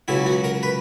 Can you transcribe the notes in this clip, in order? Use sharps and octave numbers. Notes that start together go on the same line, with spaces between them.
C#2 C#3 F#3 E4
F#4
A#4
B4